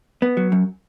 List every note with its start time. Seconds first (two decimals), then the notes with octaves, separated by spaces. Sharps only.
0.22 B3
0.37 F#3
0.52 F#2